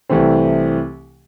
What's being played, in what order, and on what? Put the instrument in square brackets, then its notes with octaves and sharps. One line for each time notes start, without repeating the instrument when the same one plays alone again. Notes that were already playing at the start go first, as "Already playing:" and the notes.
[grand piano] C2 C3 E3 A3 C4